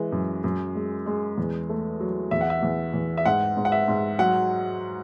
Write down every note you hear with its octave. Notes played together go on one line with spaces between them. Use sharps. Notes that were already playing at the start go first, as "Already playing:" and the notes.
Already playing: E3 G#3
F#2
F#2
G#3
G#3
E2
A3
F#3
E2 E5
F#5
E5
E2
E2
E5
G#2 F#5
G#2
F#5
E5
G#2
F#3 F#5